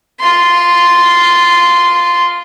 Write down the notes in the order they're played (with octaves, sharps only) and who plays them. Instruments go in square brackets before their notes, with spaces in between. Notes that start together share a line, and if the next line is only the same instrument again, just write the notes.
[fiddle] F4 C6